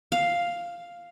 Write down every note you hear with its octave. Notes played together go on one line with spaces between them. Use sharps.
F5